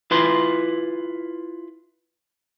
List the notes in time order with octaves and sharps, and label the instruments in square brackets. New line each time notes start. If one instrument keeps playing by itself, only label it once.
[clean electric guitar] E4 F4 B4 B5 C6